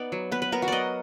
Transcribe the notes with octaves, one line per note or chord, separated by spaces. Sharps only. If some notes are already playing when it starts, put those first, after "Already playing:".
Already playing: B3 D#4 D5
F#3
B3 B4
B4
B3 A#4
F#4
F#3 D5 D#5